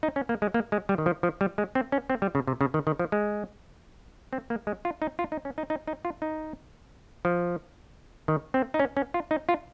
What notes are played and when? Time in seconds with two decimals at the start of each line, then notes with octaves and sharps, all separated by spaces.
0.03 D#4
0.16 C#4
0.29 A#3
0.42 G#3
0.54 A#3
0.72 G#3
0.89 G3
0.98 D#3
1.06 F3
1.23 F3
1.41 G3
1.58 G#3
1.75 C4
1.92 C#4
2.10 C4
2.22 G3
2.35 C#3
2.47 C3
2.61 C#3
2.74 D#3
2.87 D#3
2.99 F3
3.12 G#3
4.33 C4
4.50 A#3
4.67 G#3
4.85 F4
5.02 D#4
5.19 F4
5.32 D#4
5.45 C#4
5.58 D#4
5.70 D#4
5.87 D#4
6.05 F4
6.22 D#4
7.25 F3
8.28 D#3
8.54 C4
8.74 D#4
8.79 C#4
8.97 C#4
9.14 F4
9.31 D#4
9.49 F4